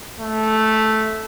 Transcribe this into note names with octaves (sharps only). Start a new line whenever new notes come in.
A3